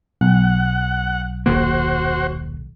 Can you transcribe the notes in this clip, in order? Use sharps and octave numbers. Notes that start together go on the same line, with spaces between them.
B1 F#5
D#1 D#3 A#3 F#4 C5